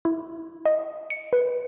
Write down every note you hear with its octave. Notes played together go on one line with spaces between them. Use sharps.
E4
D#5
C#7
B4